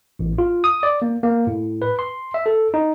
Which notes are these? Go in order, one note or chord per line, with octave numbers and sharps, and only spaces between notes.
A1
F4
D#6
D5
A#3
A#3
A2
B4
C6
E5
A4
D#4